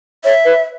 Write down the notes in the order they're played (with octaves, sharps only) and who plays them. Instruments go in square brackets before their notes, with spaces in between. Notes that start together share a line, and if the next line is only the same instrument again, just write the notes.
[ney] C#5 [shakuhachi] E5
[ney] B4